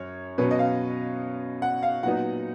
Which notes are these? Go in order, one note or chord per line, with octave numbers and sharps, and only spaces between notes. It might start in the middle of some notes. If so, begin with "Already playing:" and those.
Already playing: F#2 C#5
B2 F#3 C#4 B4
D#5
F5
F#5
F5
A#2 F#3 B3 D#4 F#5